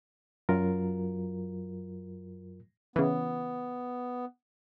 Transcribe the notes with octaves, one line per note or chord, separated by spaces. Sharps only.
F#2 F#3 F4 A#4
C#3 E3 B3